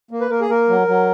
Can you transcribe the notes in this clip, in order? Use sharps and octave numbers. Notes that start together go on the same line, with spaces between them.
A#3
B4
A#3 A#4
G#4
A#3 A#4
F#3
F#3